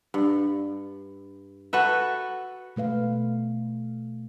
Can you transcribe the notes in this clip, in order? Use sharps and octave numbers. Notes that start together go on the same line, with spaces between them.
G2
F#4 A4 B4 E5
B2 A3 B4 F5